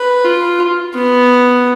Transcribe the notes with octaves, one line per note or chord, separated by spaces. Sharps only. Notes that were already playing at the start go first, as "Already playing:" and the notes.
Already playing: B4
F4
B3